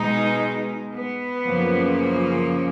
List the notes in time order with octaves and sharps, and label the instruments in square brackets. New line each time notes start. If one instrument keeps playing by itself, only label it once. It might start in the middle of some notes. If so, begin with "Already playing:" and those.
Already playing: [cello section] B2 G#3 D#4
B3
F#2 C#3 F3 A#3